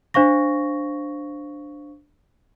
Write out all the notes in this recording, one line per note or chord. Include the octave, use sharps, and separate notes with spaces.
D4 C5 F5 C#6 A#6